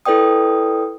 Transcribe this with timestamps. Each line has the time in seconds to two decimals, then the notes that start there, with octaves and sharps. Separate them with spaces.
0.06 E4 A4 B4 D5 G5 D#6